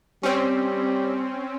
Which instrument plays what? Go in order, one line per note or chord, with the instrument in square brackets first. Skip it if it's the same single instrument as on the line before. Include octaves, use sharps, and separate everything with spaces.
[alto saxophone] G3 [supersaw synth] C4 C#4